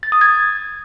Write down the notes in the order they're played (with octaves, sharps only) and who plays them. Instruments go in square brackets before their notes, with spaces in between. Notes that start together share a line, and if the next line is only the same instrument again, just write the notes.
[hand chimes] A6
D#6
G#6